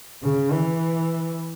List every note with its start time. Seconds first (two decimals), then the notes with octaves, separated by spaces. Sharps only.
0.23 C#3
0.51 E3